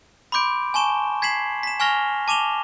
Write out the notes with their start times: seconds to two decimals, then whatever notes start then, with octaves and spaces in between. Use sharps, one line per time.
0.32 B5 C6 D6 G6 D7
0.74 G#5 A5 C#6 E7 G7
1.22 G#6 B6 C7 E7 F#7
1.63 B6 E7
1.80 G#5 C#6 F6 A#6 F7 G7
2.28 A5 D6 E7 F7 G7